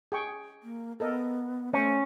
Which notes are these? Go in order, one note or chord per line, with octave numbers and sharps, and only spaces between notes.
G#4 G5 C#6
A#3
B3 A4 A#4 D#5
A3 C#4 C5